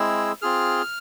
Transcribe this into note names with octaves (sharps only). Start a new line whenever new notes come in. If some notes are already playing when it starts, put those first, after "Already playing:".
Already playing: G#3 C4 E4 G#4 E6
C4 F4 G#4 F6